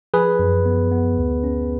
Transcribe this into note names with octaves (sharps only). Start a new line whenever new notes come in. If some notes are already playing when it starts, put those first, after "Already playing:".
F3 G#4 B4
F#2
B3
B3
D2
C#4